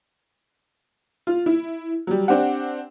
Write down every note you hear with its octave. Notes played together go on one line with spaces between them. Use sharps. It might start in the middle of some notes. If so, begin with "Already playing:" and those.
F4
E4
F#3 G3
C4 D4 G4 F#5